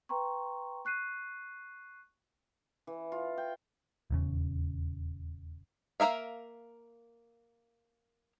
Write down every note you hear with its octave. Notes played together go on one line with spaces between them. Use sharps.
B4 G5 A#5 C6 C#6
C#6 F#6 C7 D#7
E3
F4
G5
D#1 E2 C#3
A#3 A4 A#4 E5 F5